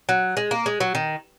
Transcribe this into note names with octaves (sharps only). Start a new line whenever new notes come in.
F#3
G#3
A#3
G#3
F#3
D#3